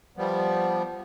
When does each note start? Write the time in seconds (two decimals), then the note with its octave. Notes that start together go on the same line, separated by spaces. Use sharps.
0.17 F3 G3 B3